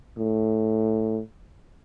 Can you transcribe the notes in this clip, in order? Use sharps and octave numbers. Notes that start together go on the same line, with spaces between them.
A2